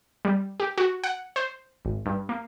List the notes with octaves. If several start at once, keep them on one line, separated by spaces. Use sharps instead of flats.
G3
G4
F#4
F#5
C5
G#1
G2
A#3